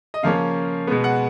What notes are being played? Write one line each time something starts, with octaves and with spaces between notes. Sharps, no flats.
D#5
C#3 F3 A#3 C#4 F5
B2 G#3 B3
F#5